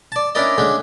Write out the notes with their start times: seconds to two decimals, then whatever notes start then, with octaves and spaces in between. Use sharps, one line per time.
0.12 D5 A5
0.35 C#4 D4 E4 A#4 D5 D#5
0.58 D3 G#3 A3 C#4 D4